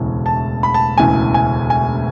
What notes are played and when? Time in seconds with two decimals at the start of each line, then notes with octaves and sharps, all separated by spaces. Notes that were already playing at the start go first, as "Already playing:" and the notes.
Already playing: E1 D2 C#3 E3
0.26 A5
0.63 B5
0.74 A5
0.98 E1 D2 C#3 E3 G#5
1.34 G#5
1.70 G#5